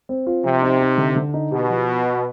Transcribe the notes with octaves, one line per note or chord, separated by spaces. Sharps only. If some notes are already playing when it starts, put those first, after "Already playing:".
C4
F4
C3 F3
D#4
D#4
D3
D3
D#4
B2 G4
F3